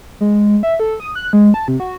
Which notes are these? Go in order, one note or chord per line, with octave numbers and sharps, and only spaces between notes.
G#3
E5
A4
D#6
F#6
G#3
A5
C3
F#4